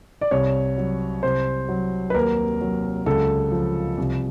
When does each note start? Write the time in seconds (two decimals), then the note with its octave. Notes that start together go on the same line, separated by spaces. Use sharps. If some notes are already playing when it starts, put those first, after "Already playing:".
0.21 D5
0.31 C2 C#5
0.78 F#3
1.23 C2 C5
1.69 F#3
2.10 B4
2.14 D#2 A#4
2.61 F#3
3.06 C#2 A4
3.52 F3
3.98 C2